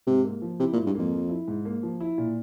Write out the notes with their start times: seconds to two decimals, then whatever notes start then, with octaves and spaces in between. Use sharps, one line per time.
0.07 G#2 C3
0.25 A#3
0.42 F3
0.60 C3 E4
0.73 A#2
0.78 G#2
0.86 G2
0.95 F2 A#3
1.13 F3
1.29 E4
1.48 G#2
1.65 A#3
1.83 F3
2.00 E4
2.18 A#2